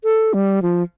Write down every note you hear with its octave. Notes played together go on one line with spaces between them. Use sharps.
A4
G3
F3